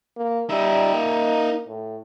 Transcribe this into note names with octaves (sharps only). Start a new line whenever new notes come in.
A#3
G3 D#4 E5
A#3
A2